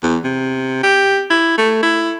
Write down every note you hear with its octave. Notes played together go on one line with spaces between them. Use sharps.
E2
C3
G4
E4
A3
E4